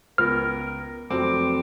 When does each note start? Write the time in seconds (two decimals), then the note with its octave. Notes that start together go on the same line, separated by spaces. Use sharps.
0.18 C#2 B3 A#4 F6
1.11 F1 F#3 C4 D6